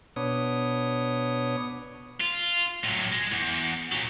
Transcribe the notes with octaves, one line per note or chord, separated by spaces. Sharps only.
B2 B3 D4 C#5 D#6
F4
A2 F#3
G#3
E2
A#2 F#3